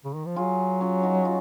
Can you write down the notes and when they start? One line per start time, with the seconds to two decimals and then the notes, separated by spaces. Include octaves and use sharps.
0.05 C#3
0.15 D#3
0.26 F3
0.36 F#3 F4 G#4
0.81 C#4 F4
1.03 D#4 F#4
1.25 F4